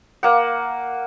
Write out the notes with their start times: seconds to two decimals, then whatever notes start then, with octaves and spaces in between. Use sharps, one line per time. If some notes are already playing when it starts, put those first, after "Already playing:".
0.23 A#3 F#5